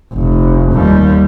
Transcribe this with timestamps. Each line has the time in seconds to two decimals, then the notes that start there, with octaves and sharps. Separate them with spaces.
0.13 F1
0.73 D#2 G3